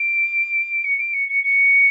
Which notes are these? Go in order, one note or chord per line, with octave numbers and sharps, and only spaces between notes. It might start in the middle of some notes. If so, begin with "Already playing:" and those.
Already playing: D7
C#7
D7
C#7
C#7
C#7